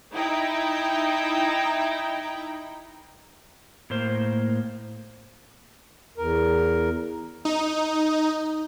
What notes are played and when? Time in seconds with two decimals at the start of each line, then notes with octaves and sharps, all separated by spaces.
0.14 D#4 E4 G5
3.90 A2 A#3 C5
6.18 E2 A#4
7.45 D#4